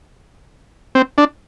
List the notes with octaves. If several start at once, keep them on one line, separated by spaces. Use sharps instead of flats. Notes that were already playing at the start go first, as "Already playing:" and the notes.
C4
D4